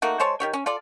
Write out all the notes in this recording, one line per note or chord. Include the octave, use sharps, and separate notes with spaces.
A3 A#3 D#4 F#4
G#3 C5 C#5 A5
D#3 G4 C#5
C#4
F4 A4 D5